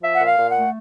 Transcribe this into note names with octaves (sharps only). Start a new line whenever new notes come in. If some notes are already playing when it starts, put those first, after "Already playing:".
F3 E5
F#5
A#2
F5
A#2
F#5
A3